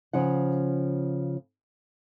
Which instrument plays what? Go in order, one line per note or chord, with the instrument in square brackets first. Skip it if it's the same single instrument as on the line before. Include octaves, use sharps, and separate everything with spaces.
[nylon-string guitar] C#3 F3 F#5